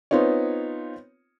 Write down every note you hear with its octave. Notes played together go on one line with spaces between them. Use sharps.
B3 C4 D#4 F4 C#5